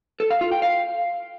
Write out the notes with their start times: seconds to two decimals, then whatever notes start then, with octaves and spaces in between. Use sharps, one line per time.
0.20 A4
0.30 F5
0.41 F4
0.52 G5
0.62 F5